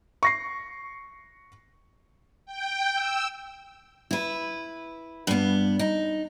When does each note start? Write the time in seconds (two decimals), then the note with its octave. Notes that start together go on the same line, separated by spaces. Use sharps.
0.23 C#6 A#6 C7
2.46 G5
2.94 E6
4.11 E4 B4
5.27 G2 B3
5.79 D#4